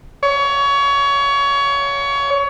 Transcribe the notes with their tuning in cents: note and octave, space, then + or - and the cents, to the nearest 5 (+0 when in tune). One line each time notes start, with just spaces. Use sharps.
C#5 +25